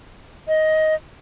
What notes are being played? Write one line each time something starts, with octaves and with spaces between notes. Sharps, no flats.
D#5